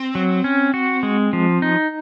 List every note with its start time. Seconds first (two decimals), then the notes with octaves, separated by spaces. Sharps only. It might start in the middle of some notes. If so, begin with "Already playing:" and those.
Already playing: C4
0.15 F#3
0.44 C#4
0.74 F#4
1.03 G#3
1.33 F3
1.62 D#4